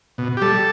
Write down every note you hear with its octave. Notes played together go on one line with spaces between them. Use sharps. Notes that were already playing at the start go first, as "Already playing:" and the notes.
B2
G4
G3 A4